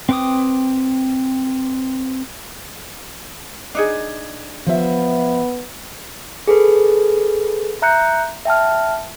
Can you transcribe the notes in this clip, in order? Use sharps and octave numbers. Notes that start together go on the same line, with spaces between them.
C4 B4 G5 D6 D#6
D4 D#4 G#4
F3 B3 E5
G#4 A4 B4
E5 A#5 F#6 G6 C#7
E5 G5 A5 F6